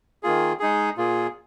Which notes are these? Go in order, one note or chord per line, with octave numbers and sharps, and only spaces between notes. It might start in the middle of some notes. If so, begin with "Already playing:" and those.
D#3 A#3 F4 G#4
G#3 D#4 G#4
A#2 A#3 F4 G#4